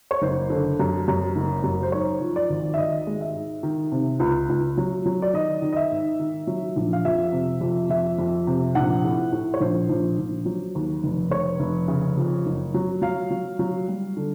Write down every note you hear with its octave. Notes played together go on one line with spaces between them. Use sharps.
C#5
F#1 C5
D3
F#2
F#2
F#1
F#2
C5
G#2 C#5
F3
D5
G#1
E5
G#1 D#5
G#3
E5
G#2
D#3
C3
C#2
C#2
F#3
F#3
D5
D#3 D#5
D#3
D#5
E5
G#2
D#3
F#3
A#1
F5
F2 E5
C3
F2
F2 E5
F2
C3
A#1 F#5
A2
A2
C#5
A#1 C5
A#1
A#1
F#3
D#2
F1
F1 C#5
F1
C#3
F2
F#1
F#3
F#3 F5
F#3
F#3
G3
D3